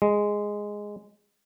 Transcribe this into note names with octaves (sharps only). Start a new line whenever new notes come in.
G#3